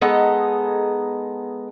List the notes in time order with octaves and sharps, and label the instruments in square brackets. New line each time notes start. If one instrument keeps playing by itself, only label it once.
[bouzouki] G#3 B3 D#4 A4